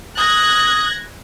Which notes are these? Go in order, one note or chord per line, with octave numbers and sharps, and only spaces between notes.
D#6 F#6 G#6 A#6